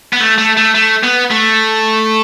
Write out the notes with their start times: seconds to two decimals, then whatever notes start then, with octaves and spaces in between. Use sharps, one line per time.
0.13 B3
0.21 A3
0.38 A3
0.57 A3
0.74 A3
1.03 B3
1.31 A3